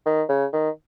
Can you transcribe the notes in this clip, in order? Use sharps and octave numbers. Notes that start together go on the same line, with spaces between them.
D#3
C#3
D#3